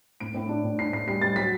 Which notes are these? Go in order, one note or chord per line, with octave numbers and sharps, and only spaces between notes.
A2 D7
A2
D4
A2
D4 C7
A2 C7
G3 C7
G3 A6
F#3 B6